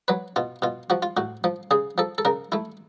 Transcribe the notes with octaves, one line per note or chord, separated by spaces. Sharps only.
F#3 B4
B2 F4
B2 F4
F3 F#4
F4
A2 F#4
F3
C#3 G#4
F3 A4
A4
C#3 A#4
A3 E4